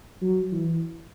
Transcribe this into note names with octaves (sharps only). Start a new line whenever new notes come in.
F#3
E3